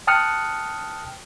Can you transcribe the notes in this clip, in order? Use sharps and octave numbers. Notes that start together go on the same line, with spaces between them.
G5 A5 D#6 F6 F#6 C#7